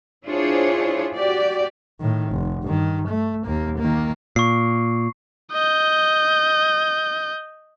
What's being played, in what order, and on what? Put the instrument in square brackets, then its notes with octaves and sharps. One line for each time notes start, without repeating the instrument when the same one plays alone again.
[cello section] D4 E4 F4 G#4 C5 C#5
F#4 G4 D5
[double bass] A2 D#3
F1
G2 D#3
A3
D#2 A#3
D#3 A#3
[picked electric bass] A#2 [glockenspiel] C#6 C7
[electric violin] D#5 G6